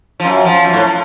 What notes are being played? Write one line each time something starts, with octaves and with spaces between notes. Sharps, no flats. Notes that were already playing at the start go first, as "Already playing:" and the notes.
F3
F#2
F3
F#2
A2